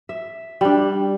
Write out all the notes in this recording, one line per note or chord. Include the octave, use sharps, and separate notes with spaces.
E5
G3 D4